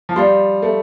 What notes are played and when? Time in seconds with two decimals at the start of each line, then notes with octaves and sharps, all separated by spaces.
0.09 F3
0.16 G3 D5 F5 C6
0.62 A3